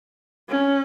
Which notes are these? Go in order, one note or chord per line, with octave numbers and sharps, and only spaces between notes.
C#4